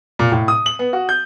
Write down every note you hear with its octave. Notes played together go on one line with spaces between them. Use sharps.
A#2
A2
D#6
F#7
B3
F#4
G6